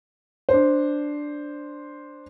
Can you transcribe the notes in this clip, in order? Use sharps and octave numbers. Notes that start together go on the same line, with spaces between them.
D4 C5